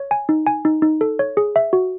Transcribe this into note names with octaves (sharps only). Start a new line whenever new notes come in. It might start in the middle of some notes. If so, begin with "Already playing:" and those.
Already playing: C#5
G#5
D#4
G#5
D#4
D#4
A4
C#5
G#4
E5
F#4